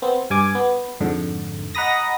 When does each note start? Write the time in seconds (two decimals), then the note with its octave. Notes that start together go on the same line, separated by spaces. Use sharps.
0.02 B3 C4
0.30 G2 G#5 D6
0.55 B3
1.00 F2 G#2 D3
1.75 D#5 F#5 A#5 B5 D#6 A#6